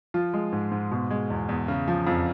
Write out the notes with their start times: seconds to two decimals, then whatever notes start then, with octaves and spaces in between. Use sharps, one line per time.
0.14 F3 F4
0.34 G#3
0.52 G#2
0.72 G#2
0.91 B2
1.10 G#3
1.30 E2
1.49 E2
1.68 C#3
1.88 F3
2.07 F2